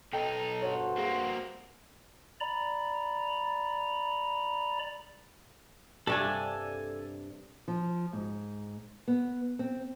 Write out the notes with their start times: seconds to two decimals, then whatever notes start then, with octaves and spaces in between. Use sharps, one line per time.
0.13 B1 D#4 A4 G5
0.62 G2 F#4 C5 C#5
0.98 A#3 C4 G#4
2.40 D5 A#5 B5
6.07 G2 C3 D4 A4 G#5
7.68 F3
8.13 G#2
9.08 B3
9.59 C4